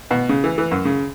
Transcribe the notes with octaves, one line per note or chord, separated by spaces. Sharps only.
B2
C#3
E3
E3
F#2
C#3